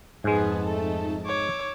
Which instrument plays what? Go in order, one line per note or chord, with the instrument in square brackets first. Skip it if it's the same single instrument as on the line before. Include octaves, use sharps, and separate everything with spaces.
[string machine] F2 D#4 A5 [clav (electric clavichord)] G#2 G#3 [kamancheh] B3 G#4
[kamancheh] A3 A4
[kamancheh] C#5 D6 [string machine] E6